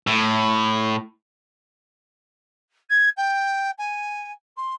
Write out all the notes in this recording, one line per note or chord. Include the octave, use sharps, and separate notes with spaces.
A2
G#6
G5
G#5
C6